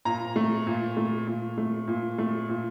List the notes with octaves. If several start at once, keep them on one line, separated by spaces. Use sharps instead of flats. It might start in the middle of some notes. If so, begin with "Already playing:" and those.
A#2 A#5
A3
A#2
A3
A#2
A3
A#2
A3
A#2